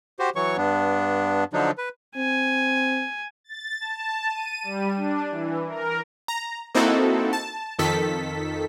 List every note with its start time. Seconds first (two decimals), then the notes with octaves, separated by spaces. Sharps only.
0.19 F#4 G4 C5
0.36 E3 F#3 C#5 C#6
0.57 G2 B3 D4
1.53 D3 F3 F#3 D4 D#4
1.78 B4
2.16 C4 G#5
3.44 A6
3.80 A5
4.29 D#7
4.63 G3
4.97 D4
5.31 E3
5.68 A#4
6.28 A#5
6.75 A#3 C4 D#4 E4 F#4 A4
7.33 A5
7.79 F2 D#3 A4 B6